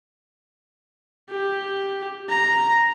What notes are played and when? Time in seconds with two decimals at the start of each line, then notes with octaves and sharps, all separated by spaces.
1.30 G4
2.29 A#5